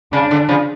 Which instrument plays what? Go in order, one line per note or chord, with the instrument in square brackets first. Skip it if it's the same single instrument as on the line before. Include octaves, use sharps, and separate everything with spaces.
[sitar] C#3 [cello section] D4
[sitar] D3
C#3 F3